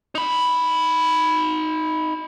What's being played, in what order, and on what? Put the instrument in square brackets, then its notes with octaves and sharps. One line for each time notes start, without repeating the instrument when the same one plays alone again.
[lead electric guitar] D#4 B5